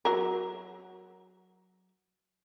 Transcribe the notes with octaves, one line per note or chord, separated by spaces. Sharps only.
F#3 A#4